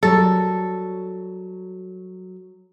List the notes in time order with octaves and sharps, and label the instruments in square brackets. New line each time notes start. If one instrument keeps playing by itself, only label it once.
[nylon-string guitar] F#3 G3 A#4 [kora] A4